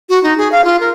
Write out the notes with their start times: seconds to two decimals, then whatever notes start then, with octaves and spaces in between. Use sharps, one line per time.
0.09 F#4
0.23 D#4
0.38 G#4
0.52 F5
0.64 F4
0.80 A#4